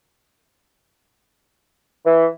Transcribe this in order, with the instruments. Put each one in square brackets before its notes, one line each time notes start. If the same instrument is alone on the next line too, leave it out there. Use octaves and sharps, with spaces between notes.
[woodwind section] E3